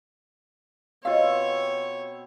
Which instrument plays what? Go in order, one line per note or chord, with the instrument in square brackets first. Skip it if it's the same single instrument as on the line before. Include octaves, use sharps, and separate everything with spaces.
[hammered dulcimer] B2 C4 [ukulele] F4 F5 [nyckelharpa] C#5